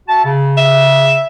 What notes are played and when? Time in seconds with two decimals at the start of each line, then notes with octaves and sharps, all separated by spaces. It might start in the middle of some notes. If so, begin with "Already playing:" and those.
0.09 F#4 E5 A5
0.25 C#3
0.58 E5